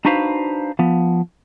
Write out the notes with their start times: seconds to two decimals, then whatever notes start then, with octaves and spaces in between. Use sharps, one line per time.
0.05 D4 D#4 F#4 B4 C5 F5
0.79 F3 B3